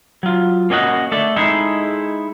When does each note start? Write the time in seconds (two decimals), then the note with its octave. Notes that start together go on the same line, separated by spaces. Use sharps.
0.23 F#3 F4
0.70 A#3 C#4 F#4 D#5 F#5
1.12 A3 A4 D5
1.36 G#3 D#4 E4 G#4 A4